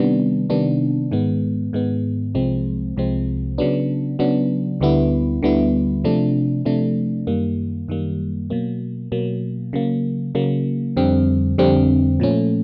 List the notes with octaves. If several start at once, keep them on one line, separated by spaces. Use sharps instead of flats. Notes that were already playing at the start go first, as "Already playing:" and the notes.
Already playing: C3 D#3 G3 B3 D4
C3 D#3 G3 B3 D4
G#2 D#3 G#3 B3
G#2 D#3 G#3 B3
C2 C3 F3 G#3 C4
C2 C3 F3 G#3 C4
C#3 F#3 B3 D4
C#3 F#3 B3 D4
D2 D3 G3 B3 E4
D2 D3 G3 B3 E4
C3 F3 A3 D4
C3 F3 A3 D4
F#2 D#3 G3 A#3
F#2 D#3 G3 A#3
B2 F#3 A#3
B2 F#3 A#3
C#3 F#3 A#3
C#3 F#3 A#3
F2 D3 G3 C4
F2 D3 G3 C4
A#2 F3 A3 C#4